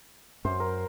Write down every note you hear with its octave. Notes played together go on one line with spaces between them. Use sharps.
F#2 C5
A#4